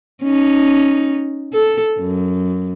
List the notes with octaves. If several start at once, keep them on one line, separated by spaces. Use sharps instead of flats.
C#4 D#4
A4
F#2